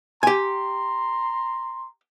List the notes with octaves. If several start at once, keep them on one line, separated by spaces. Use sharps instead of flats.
G4 G#5 A#5 C6